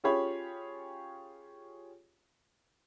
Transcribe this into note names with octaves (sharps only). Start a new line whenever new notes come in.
C#4 F4 G4 G#4 C#5 B5